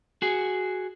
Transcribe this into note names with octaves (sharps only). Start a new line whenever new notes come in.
F#4 G#4